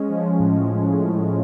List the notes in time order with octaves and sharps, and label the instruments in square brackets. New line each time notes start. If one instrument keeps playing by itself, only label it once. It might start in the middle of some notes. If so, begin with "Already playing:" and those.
Already playing: [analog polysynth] G#3 C#4
F3
A2